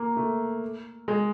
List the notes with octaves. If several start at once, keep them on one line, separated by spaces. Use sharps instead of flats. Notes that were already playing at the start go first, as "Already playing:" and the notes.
Already playing: A#3
A3
G#3